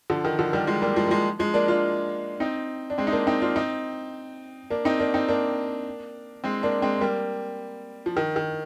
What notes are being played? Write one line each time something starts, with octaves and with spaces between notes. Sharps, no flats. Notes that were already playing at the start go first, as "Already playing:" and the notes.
D3 F3
D#3
D3 F3
D#3 G3
F3 G#3
G3 A#3
F3 G#3
A#3
F3 G#3
F3 G#3
A#3 D4
D4 F4
C4 D#4
D4
G#3 C4
D#4
A#3 D4
C4 D#4
D4 F4
C4 D#4
A#3 D4
C4 D#4
A#3 D4
C4 D#4
A#3 D4
G#3 C4
A#3 D4
G#3 C4
G3 A#3
F3
D#3
D#3